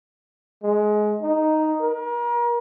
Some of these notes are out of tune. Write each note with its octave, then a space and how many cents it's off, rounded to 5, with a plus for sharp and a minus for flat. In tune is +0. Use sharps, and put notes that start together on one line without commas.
G#3 +20
D#4 +0
A#4 +35